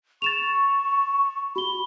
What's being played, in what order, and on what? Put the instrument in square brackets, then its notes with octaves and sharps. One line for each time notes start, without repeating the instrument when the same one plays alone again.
[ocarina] C#6 [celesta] A6 E7 F7
[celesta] F#4 G7 [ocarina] B5